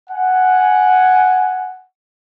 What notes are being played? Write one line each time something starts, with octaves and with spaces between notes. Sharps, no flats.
F#5 G#5